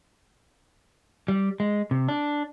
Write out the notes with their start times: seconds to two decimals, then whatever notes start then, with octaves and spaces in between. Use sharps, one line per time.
1.28 G3
1.60 G#3
1.91 C3
2.08 D4